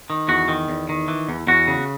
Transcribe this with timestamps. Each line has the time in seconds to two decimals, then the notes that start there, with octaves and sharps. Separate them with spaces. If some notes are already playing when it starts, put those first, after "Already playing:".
0.10 D#3
0.28 E2 F#4
0.48 D#3
0.69 E2
0.89 D#3
1.08 E3
1.29 E2
1.47 E2 F#4
1.67 C#3